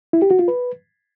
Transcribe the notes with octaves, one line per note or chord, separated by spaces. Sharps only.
E4
G4
F#4
F4
B4